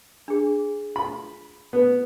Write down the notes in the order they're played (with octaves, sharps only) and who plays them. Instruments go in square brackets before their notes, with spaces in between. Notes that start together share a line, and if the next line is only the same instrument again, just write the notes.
[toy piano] D4 G#4
[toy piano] F4 [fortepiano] B5
[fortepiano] B3